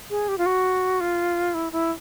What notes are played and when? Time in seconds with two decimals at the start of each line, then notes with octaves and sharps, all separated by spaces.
0.10 G#4
0.28 G4
0.38 F4
0.46 F#4
1.00 F4
1.54 E4
1.72 E4